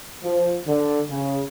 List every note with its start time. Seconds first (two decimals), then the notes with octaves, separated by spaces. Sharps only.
0.23 F3
0.67 D3
1.09 C#3